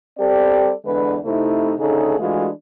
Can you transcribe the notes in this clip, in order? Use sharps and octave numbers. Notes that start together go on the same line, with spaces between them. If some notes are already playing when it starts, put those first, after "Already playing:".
G3 C4 G4 A4 D5
E2 D3 G#3 D4 B4
C3 A3 C4 D#4 E4
D2 C#3 D#4 G#4 A4
E3 G#3 A3 D4 F4 F#4